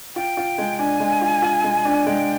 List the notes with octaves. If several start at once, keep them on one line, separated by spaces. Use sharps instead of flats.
F4 G5
F4
G#3
D4 G#5
G#3
F4
F4
G#3
D4
G#3 G5